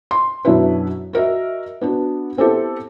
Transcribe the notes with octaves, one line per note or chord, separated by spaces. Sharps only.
C6
F#2 B2 D4 E4 B4
F#4 A#4 D#5 E5
B3 D4 F#4
B3 C4 E4 G4 A4